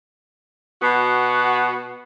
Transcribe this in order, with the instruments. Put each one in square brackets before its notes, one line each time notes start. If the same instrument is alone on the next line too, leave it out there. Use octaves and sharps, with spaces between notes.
[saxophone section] B2 B3 F#4